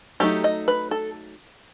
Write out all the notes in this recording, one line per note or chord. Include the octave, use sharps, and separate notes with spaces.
F#3 A3 D#4 G4
D#5
B4
A4